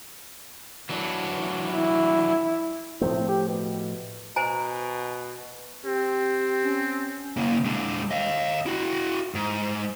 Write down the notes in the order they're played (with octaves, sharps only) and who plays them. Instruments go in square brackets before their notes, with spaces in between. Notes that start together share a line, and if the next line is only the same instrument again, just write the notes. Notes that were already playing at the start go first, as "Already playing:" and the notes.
[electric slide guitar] E3 F#3 D4
[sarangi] E4
[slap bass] A2 F3 A3 [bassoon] C4
[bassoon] G4
B2
[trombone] B2 [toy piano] C5 G#5 A#5
[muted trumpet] C4 [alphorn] G4
[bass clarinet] C#4
[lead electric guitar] C#3 A#3
G#3 D4
D#5 F5
E4 F#4
G#2